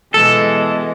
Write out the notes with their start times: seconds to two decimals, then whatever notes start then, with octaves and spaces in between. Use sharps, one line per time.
0.14 B2 E3 G#3 A4